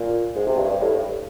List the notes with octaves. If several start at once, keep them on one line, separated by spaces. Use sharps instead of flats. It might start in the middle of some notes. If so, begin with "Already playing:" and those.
Already playing: A#2
G#2
C3
G2
G2
A2
G2